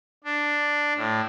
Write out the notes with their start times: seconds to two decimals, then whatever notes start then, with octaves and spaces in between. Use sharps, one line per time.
0.24 D4
0.97 A2